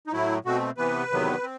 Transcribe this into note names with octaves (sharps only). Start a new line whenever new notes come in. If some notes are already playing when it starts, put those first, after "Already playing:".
D#4
A2 F#3 A3 E4
B2 A3 C4 F#4
C3 E3 B3 B4
E2 C3 D#3 F#3 B3
C4